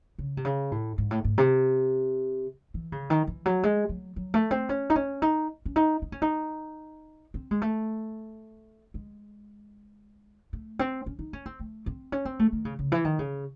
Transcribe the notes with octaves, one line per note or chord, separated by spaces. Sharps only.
C#3
C3
C#3
A2
G#2
A2
G#2
C3
E3
C#3
D#3
E3
F#3
G#3
F#3
F#3
A3
C4
C#4
D#4
C#4
D#4
C#4
D#4
D#4
C#4
D#4
C4
G#3
A3
G#3
A3
C4
C#4
D#4
C#4
C4
A3
C4
C#4
C4
A3
D#3
C#3
C#3
E3
D#3
C#3